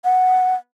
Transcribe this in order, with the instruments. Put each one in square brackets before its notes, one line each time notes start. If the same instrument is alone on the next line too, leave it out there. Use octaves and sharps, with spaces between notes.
[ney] F#5